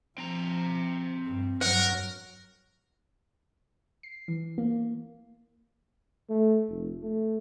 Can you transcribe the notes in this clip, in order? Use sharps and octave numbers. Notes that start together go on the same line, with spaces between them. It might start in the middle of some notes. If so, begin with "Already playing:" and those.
F3 C4 A#5
G2
G2 F#3 A#4 F#5
C7
E3
A#3
A3
F1
A3